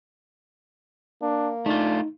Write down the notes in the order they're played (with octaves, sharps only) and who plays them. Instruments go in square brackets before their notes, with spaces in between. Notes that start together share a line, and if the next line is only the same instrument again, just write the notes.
[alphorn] A#3 [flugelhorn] D4
[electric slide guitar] A3 F4 [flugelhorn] D4 [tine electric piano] D#4